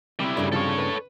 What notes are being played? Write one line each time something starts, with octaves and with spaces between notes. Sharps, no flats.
C3 G3 E4
G2 C#3 F#3 A3
C3 F3 F4 A4 C#5
B4